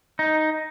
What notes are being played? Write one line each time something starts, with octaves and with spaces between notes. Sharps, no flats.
D#4